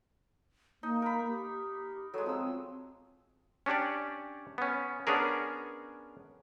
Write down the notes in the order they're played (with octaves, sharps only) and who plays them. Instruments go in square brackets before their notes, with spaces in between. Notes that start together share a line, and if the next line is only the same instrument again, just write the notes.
[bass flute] A#3 [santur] D#4
[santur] A#4 B5
[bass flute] G4
[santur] F#3 G#3 [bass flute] A4
[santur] F3 E6 [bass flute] C4
[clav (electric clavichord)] C#4 D4 G4 C#5 D5
B3 C#4
B3 C#4 D4 G#4 A#4